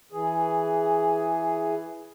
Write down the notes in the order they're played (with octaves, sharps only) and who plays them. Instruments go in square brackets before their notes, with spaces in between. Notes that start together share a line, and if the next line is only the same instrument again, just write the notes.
[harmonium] E3 G#4